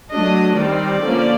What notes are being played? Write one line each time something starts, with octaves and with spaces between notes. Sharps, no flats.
F#3 A3 D4 D#5
D#3 G3 C4 D5
D3 F3 A#3 C#4